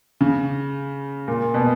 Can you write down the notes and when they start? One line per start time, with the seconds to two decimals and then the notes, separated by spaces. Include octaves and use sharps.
0.21 C#3
1.28 A#2
1.54 B2